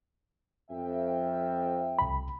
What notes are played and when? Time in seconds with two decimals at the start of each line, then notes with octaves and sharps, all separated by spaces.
0.71 F2 E5 G5
1.99 C2 B5